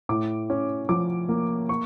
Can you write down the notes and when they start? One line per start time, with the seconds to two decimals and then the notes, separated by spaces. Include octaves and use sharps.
0.09 A2 D6
0.50 C#4
0.89 F3 D6
1.29 A#3
1.69 C#6